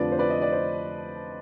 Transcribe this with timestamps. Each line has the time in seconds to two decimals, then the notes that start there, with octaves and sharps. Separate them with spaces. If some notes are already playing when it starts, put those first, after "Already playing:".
Already playing: F1 F2 D3 F3 B4 D5
0.12 C5
0.19 B4 D5
0.30 D#5
0.42 D5
0.52 C5